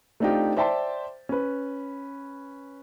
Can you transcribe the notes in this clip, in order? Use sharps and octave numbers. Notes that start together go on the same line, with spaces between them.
A3 C4 D4 D#4 F4 G4
C5 D5 E5 G5 A5 C6
C#4 B4